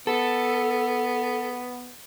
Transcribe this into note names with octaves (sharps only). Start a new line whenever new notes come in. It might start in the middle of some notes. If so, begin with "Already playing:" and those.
B3 A4